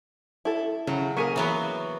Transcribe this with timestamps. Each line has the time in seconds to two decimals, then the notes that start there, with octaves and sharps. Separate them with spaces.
0.45 E4 A4
0.87 C#3 F#3
1.17 A#3 G#4 A#4 C#6 B6 D#7
1.36 E3 F#3 B3